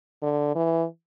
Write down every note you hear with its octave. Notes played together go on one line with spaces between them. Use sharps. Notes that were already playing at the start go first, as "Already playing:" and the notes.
D3
E3